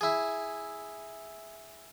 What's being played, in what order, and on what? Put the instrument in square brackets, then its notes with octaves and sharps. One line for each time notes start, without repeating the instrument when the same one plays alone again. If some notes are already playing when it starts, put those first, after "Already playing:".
[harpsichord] E4 G#4